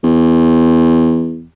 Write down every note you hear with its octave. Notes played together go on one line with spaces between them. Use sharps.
E2